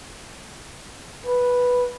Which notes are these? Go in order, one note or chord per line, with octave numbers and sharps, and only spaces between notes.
B4